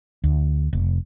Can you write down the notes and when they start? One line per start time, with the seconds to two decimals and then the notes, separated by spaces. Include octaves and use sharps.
0.24 D2
0.73 F1